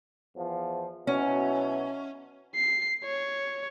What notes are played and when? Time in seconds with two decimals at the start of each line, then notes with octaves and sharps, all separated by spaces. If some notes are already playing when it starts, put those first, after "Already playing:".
0.36 E2 F3
1.07 B2 F#3 C#4 E4
2.56 C7
3.04 C#5